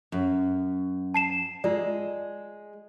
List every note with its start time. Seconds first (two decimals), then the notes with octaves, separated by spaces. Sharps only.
0.12 F#2
1.14 A5 C7 E7
1.64 G#3 F4 D5